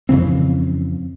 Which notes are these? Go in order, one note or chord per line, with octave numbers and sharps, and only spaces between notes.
F2 C#3 E3 C4